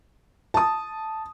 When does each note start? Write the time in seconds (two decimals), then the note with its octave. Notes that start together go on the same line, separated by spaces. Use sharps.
0.54 A5 D#6